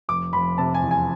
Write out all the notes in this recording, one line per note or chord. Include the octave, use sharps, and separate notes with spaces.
F1 D6
F1 B5
C3 A5
G#5
E2
G#5